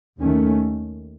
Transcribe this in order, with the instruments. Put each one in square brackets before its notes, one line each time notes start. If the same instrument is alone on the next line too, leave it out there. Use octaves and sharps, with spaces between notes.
[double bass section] D#2 D#3 A3 C#4